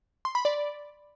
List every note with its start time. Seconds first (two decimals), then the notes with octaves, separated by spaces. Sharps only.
0.25 C6
0.35 B5
0.45 D5